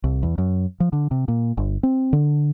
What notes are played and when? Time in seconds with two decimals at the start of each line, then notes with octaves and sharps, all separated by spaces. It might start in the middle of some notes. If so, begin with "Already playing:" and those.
0.04 C2
0.23 E2
0.38 F#2
0.80 F3
0.93 D3
1.11 C3
1.28 A#2
1.57 G1
1.83 C4
2.13 D3